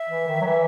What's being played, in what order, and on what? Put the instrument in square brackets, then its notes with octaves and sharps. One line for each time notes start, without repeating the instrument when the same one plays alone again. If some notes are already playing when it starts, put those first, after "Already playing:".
Already playing: [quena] E5
[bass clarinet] E3
D#3
F#3
E3